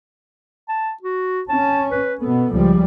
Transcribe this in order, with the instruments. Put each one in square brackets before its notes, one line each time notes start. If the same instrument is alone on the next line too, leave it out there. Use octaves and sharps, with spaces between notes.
[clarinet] A5
F#4
[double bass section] C#4 [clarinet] A5
[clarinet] B4
[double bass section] B2 B3 [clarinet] A4
[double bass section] C#2 F3 G3